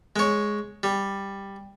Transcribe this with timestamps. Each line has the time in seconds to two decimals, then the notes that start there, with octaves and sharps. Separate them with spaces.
0.16 G#3 C#5
0.83 G3